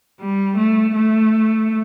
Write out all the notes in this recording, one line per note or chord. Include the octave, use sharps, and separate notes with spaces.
G3
A3
A3